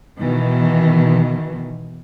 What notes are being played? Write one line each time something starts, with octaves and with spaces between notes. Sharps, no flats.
B2 D#3 E3